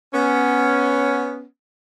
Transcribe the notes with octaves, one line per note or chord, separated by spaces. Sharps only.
B3 C#4